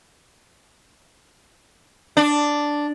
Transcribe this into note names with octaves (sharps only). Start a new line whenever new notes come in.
D4